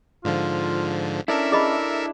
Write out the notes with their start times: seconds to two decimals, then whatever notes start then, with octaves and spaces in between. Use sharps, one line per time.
0.25 G#2 D3 F3 F4
1.28 C#4 D4 E4 A4 A#4 E5
1.52 G#4 D#5 B5